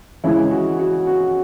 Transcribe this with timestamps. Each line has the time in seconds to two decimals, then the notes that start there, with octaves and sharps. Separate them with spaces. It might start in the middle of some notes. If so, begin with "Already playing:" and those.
0.24 C#3 E3 G#3 E4
0.51 F#4
0.79 F#4
1.07 F#4